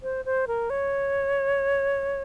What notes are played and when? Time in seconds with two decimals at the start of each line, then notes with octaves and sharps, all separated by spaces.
0.03 C5
0.25 C5
0.47 A#4
0.70 C#5